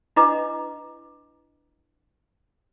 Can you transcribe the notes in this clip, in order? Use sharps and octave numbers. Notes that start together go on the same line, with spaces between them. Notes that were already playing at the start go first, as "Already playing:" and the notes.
D4 E4 B4 D#5 A#5 D6